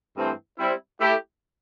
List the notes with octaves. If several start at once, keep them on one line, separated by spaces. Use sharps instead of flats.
G2 E3 A3 C4
G3 C4 E4
A3 E4 G4